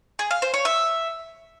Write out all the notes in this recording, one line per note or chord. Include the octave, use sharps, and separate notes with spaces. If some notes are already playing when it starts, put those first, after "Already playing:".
G#4
F5
C5
C#5
E5